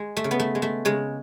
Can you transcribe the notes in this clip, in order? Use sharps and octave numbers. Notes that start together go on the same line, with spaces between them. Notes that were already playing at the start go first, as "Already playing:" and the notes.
Already playing: G#3
A3
C#3
B3
A3
G#3
A3
C#3 G#3